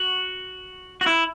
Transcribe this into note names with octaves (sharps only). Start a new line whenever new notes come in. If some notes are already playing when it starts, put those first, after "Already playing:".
Already playing: F#4
F#4
E4